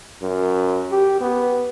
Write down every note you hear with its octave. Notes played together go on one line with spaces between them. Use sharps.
F#2
G4
B3